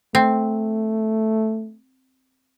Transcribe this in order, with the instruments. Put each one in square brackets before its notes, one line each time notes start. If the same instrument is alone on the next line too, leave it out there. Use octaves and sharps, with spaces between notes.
[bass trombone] A3 [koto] C4